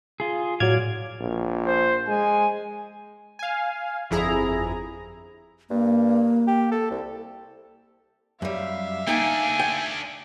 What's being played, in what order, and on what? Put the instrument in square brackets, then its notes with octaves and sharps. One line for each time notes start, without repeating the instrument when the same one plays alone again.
[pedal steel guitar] F4 G#4
[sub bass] A2 [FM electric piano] F#3 G#6 [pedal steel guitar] D5 F5
[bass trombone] A#1
[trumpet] C5
[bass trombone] G#3 [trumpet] G#5
[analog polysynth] F5 G#5
G1 F2 E4 G#4 A#5
[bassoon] G2 [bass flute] A#3
[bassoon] G4
A4
C2
[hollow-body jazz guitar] F#2 G3 [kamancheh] E5 F5
[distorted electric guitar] A3 D4 [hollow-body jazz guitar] A#3 D#4 G5 [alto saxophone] G#5
[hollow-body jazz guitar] G5